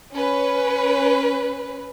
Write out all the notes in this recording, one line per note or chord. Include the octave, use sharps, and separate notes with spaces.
C#4 B4